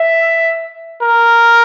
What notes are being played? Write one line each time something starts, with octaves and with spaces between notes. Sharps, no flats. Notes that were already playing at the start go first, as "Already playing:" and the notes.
Already playing: E5
A#4